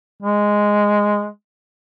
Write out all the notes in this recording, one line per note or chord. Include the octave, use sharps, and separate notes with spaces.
G#3